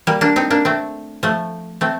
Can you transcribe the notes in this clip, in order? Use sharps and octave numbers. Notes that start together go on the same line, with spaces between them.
G3 A#3
A#3 D4
C4 D#4
A#3 D4
A3 C4
F3 A3
A3 C4